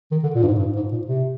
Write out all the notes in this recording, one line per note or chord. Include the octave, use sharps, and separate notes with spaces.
D#3
D3
A#2
G2
G#2
G2
G#2
A#2
C3